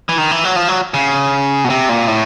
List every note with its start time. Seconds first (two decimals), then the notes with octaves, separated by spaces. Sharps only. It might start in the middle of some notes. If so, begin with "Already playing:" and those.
0.09 E3
0.18 D#3
0.31 E3
0.44 F#3
0.56 F3
0.69 F#3
0.94 C#3
1.64 B2
1.70 C3
1.89 A#2
2.07 A2